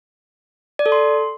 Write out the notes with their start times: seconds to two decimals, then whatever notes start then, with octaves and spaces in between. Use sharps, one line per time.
0.79 D5
0.86 A4
0.92 C6